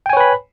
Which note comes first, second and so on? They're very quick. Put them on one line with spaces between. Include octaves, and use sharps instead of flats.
G5 G#5 C#5 B4 B5